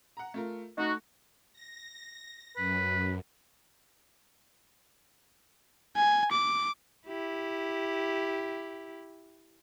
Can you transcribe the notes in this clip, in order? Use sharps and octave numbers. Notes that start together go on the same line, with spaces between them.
F#5 A#5
A3 F4 A#4
A3 D#4 F#4
A#6
F#2 B4
G#5
D6
E4 G4